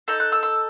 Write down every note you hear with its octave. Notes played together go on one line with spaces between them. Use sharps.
D#4 A4 E6
F#6
E6
E6